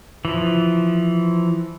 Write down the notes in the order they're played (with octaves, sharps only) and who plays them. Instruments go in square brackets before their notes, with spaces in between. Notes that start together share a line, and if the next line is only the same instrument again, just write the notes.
[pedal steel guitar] E3 F3